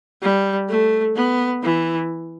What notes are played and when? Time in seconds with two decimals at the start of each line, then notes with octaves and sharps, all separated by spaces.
0.22 G3
0.69 A3
1.16 B3
1.63 E3